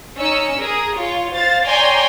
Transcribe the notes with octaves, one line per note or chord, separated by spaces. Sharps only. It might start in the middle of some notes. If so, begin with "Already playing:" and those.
C#4 D#4 E6 C#7
G#4 A#4
F4 C#5
C5 F5 A6
C#5 D5 G5 G#5 A#5 C6